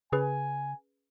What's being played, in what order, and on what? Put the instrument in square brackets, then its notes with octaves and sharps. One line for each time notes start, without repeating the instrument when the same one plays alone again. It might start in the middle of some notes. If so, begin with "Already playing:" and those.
[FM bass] C#3 [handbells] C#4 G#4 B4 [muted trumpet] G#5